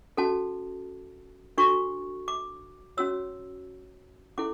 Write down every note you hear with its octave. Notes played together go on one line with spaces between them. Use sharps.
C#4 F#4 A4 A5
D4 F#4 A4 C#6
D6
C#4 F#4 C#5 E6
C#4 E4 A4 D6